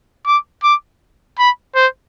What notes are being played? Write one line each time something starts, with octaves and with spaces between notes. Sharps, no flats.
D6
D6
B5
C5